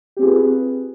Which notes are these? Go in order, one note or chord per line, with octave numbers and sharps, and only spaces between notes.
C4 F4 G4 G#4 B4